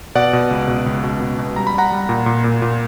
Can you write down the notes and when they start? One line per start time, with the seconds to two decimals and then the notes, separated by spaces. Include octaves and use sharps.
0.15 B2 D5 F#5
0.33 B2
0.51 C#2
0.68 B2
0.86 C#2
1.03 B2
1.21 B2
1.38 B2
1.56 G3 A#5
1.67 B5
1.74 G3 F#5 A#5
1.92 G3
2.09 A#2
2.26 A#2
2.44 A#2
2.62 A#2